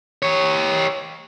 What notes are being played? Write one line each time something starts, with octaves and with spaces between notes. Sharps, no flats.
G4 C#5